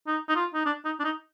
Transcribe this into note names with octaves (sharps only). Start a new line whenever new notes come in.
D#4
D#4
F4
D#4
D4
D#4
D4
D#4